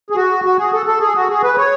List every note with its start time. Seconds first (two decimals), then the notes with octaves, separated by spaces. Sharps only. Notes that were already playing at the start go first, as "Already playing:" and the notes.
0.10 G#4
0.16 F#4
0.45 F#4
0.58 G#4
0.73 A4
0.86 A4
1.01 G#4
1.15 F#4
1.29 G#4
1.43 B4
1.58 C#5